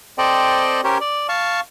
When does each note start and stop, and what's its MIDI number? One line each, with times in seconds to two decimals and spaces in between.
0.18 0.81 60
0.18 0.81 69
0.18 0.81 72
0.18 0.81 74
0.18 0.81 75
0.18 0.81 79
0.84 0.98 61
0.84 0.98 67
0.84 0.98 70
0.84 0.98 72
0.84 0.98 73
1.01 1.27 74
1.29 1.60 77
1.29 1.60 81
1.29 1.60 85